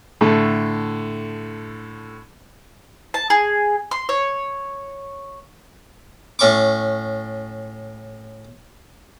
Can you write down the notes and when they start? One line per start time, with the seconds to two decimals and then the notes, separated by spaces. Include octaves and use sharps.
0.21 A2 D3 A3
3.14 A5
3.30 G#4
3.91 C6
4.09 C#5
6.39 A2 C#4 C#6 D6